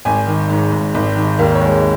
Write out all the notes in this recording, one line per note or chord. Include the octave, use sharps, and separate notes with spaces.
G#1 G#5
D#3
G#2
G#1
G#1
D#3
D#2 A#4
C#5
G#3